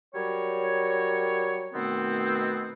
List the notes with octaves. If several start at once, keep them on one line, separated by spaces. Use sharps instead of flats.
F#3 G3 A#4 C#5
B2 D#3 A3 B3 C4